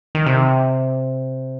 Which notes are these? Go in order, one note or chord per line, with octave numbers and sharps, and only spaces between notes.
D#3
C3